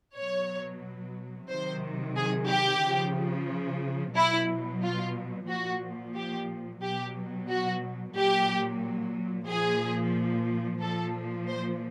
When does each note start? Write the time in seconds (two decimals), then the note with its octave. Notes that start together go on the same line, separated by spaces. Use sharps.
0.16 B2 F#3 C#5
1.49 C3 D#3 F#3 C5
2.16 G#4
2.49 G4
2.82 C#3 F3
4.15 B2 F#3 E4
4.83 F4
5.48 A#2 F3 F#4
6.16 G4
6.82 B2 F#3 G4
7.49 F#4
8.15 A#2 F#3 G4
9.48 A#2 F3 G#4
10.81 A#2 F3 A4
11.48 C5